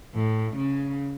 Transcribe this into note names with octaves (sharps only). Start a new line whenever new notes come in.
A2
C#3